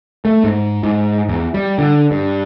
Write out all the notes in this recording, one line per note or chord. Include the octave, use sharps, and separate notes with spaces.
A3
G#2
G#2
E2
G3
D3
G2